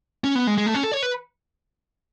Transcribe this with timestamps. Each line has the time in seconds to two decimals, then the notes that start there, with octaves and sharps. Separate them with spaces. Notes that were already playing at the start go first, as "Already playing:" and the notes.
0.24 C#4
0.35 B3
0.47 G#3
0.58 G#3
0.66 A3
0.74 C#4
0.83 A4
0.92 C#5
1.03 B4